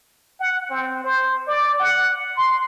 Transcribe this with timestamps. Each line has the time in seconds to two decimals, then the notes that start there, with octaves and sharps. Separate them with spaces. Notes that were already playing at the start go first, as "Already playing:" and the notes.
0.40 F#5
0.70 C4
1.04 C5
1.47 D5
1.79 F#5
2.36 C6